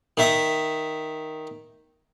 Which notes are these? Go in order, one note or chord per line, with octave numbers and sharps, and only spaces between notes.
D#3 E5 D#6